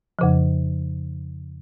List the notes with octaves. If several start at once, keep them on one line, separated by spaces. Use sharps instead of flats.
F2 C#3 F3